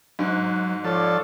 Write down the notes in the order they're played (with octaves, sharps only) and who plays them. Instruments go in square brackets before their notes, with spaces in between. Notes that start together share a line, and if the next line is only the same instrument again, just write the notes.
[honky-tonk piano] G#2 [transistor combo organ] F#3
[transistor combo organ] F3 A4 [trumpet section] C#5 D5